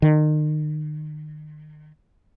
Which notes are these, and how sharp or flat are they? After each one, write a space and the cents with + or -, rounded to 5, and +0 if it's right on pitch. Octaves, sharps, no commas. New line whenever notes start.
D#3 -35